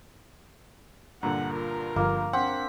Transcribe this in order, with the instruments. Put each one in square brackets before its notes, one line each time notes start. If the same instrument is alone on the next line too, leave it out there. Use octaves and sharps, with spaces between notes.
[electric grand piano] G2 A#2 D3 [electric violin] F#5 [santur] A#5
[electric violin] F4 A#4
[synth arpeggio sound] G1 F3 [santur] A#3
[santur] C4 [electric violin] D4 B6 [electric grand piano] F#5